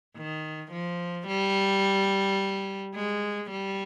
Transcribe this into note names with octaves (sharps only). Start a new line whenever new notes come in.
D#3
F3
G3
G#3
G3